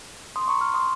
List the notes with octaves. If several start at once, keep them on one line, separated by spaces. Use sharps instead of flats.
C6 D#6
A#5 C#6
C#6 F6
C6 D#6